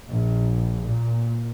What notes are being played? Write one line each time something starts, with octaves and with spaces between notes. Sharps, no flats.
A#1
A#2